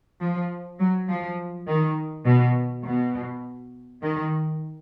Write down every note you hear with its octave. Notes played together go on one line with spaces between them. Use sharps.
F3
F#3
F3
D#3
B2
B2
D#3